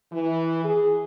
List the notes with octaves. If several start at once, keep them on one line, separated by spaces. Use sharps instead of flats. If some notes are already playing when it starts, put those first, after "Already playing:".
E3
G#4